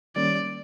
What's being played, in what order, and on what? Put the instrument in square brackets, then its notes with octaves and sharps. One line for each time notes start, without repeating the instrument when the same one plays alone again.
[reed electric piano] D#3 G3 A#3 C#4 [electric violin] D5